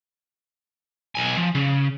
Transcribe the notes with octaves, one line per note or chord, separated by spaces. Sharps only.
B1 G#5
F3
C#3